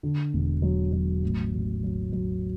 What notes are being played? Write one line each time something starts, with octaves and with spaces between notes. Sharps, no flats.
D3
E1
F#3
F#3
A1
A1
F#3
F#3